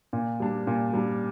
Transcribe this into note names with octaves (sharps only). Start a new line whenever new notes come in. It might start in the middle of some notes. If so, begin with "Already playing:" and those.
A#2
G3 D4
A#2
G3 D4